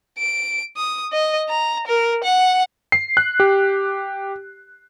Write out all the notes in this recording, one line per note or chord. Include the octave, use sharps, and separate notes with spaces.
D7
D#6
D#5
A#5
A#4
F#5
C7
F#6
G4